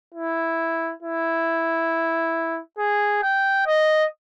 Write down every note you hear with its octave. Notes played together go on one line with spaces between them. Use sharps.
E4
E4
G#4
G5
D#5